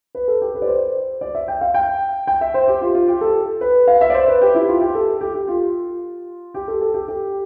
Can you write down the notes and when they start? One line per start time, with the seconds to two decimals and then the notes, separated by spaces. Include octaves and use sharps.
0.15 B4
0.28 A4
0.41 G4
0.55 B4
0.62 D5
0.67 C5
1.21 D5
1.35 E5
1.48 G5
1.61 F5
1.74 G5
2.27 G5
2.41 E5
2.54 C5
2.68 G4
2.81 F4
2.95 F4
3.08 G4
3.21 A4
3.61 B4
3.88 F5
4.01 E5
4.10 D5
4.14 C5
4.28 B4
4.41 G4
4.55 E4
4.68 F4
4.81 G4
4.95 A4
5.21 G4
5.34 G4
5.48 F4
6.54 G4
6.68 A4
6.81 A4
6.94 G4
7.08 G4